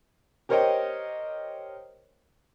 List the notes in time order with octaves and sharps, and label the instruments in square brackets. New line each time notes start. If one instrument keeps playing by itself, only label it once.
[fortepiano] G4 A#4 C5 C#5 D#5 G5